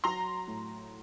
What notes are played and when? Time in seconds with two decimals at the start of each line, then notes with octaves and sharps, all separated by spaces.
0.04 F#3 A#5 C6
0.48 A2